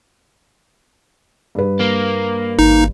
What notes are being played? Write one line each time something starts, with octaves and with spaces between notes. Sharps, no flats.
G2 B4
A#3
G#1 D#4